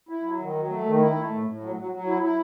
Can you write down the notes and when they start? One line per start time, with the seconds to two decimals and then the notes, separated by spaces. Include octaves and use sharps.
0.09 E4
0.23 F#3
0.39 D#3
0.55 F#3
0.69 A3
0.85 D#3
1.00 E4
1.16 A3
1.31 A2
1.45 A2
1.61 F#3
1.76 F#3
1.91 F#3
2.07 E4
2.22 E4